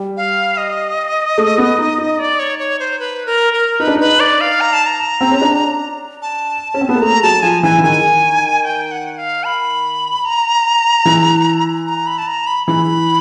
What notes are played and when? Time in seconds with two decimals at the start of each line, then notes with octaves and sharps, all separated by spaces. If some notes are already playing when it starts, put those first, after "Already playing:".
Already playing: G3
0.17 F5
0.57 D#5
1.38 A3
1.58 B3
1.79 D#4
1.98 D#4
2.19 D5
2.39 C#5
2.59 C#5
2.80 C5
2.99 B4
3.26 A#4
3.53 A#4
3.80 D#4 B4
3.87 D4
3.95 D#4 B4
4.20 D5
4.41 F5
4.61 A#5
4.73 A5
4.86 A#5
5.21 C4
5.32 C#4
5.42 D4
6.22 A5
6.74 C#4
6.81 C4
6.89 B3
6.95 A#3
7.02 A3 A#5
7.23 F#3 A5
7.42 F3 G#5
7.63 E3 G#5
7.78 E3
7.84 D#3 G#5
8.64 G5
8.91 F#5
9.18 F5
9.44 B5
10.25 A#5
11.05 E3
11.87 A#5
12.07 B5
12.18 A5
12.27 A#5
12.47 B5
12.67 E3 B5